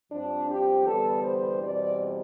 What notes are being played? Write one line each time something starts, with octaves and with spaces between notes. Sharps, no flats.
G2 F3 C4 D4
G4
E2 D3 G3 B3 A4
C5
E2 B2 G3 C4 D5